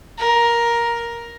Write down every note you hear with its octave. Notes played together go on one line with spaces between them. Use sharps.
A#4